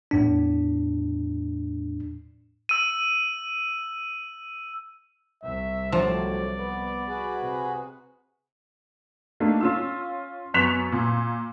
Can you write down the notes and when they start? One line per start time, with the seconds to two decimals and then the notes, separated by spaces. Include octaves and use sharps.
0.11 E2 A2 D4
2.69 E6 D#7
5.43 C2 E5
5.92 A2 D3 F3 F#3 D5
6.55 B3
7.08 F#4 G#4 B4
7.37 C3
9.40 A3 A#3 D4 D#4
9.61 C#4 F4 E6
10.54 F#2 B3 C#6 F#6 B6 F7
10.92 A#2